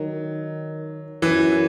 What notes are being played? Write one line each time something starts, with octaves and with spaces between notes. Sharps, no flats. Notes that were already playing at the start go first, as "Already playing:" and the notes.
Already playing: D#3 F#3
F#2 E3